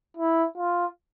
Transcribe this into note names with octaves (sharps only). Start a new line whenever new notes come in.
E4
F4